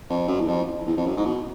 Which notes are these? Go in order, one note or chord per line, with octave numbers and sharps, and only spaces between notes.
F2
F#2
E2
F2
E2
F2
F#2
G#2
B2